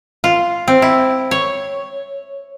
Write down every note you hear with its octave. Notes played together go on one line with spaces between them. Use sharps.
F4
C4
E4
C#5